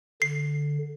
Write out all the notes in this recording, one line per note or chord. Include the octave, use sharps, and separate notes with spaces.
D3 C7